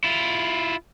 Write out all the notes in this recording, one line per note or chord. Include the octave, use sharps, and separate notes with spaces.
E4 F4